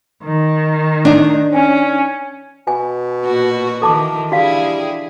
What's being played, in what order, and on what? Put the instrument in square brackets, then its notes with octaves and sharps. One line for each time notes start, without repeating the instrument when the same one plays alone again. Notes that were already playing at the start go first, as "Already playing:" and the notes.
[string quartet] D#3
[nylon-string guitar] D4 D#4
[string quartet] C#4
[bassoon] B2 [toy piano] G#5
[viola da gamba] A#2 F#4
[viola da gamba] D#3 E3 [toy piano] A4 A5 D6
[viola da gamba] D3 E4 G#4 [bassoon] G3 [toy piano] F#4 F5